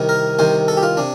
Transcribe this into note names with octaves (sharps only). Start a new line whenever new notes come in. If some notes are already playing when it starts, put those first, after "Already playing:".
Already playing: C2 C3 D#3
A#4
C2 C3 D#3 C5
A4
G4
F4
C3 D4